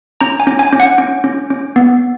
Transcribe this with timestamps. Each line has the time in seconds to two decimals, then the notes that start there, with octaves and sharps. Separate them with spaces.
0.21 C#4 A#5
0.40 G#5
0.47 C#4
0.59 G#5
0.73 C#4
0.80 F#5
0.98 C#4
1.24 C#4
1.50 C#4
1.76 B3